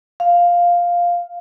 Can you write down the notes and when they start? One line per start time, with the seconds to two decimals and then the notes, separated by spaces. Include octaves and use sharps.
0.20 F5